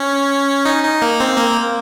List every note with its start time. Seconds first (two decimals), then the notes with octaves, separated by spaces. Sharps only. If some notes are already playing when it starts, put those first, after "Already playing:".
Already playing: C#4
0.65 D#4
0.83 D#4
1.02 A#3
1.20 C4
1.37 A#3